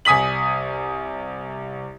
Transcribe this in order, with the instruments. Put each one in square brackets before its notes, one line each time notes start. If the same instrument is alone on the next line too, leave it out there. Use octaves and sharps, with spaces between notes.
[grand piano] C2 G#5 D#6 B6 F#7